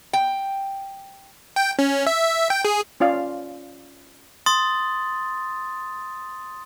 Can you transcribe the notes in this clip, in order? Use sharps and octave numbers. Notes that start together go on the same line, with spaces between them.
G5
G5
C#4
E5
G5
G#4
C#4 F4 D5 F5
C6 D#6 A6